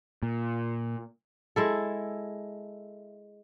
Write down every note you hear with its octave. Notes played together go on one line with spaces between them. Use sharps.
A#2
G#3 E4 A4